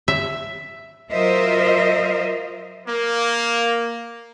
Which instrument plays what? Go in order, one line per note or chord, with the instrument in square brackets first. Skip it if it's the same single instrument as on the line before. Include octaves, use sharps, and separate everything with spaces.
[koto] E5
[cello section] F#3 F4 A#4 C5 D#5 E5
[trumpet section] A#3